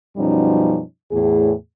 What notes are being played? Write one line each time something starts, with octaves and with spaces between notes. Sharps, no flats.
F#2 B2 F3 G3 C#4 D#4
E2 A2 G#4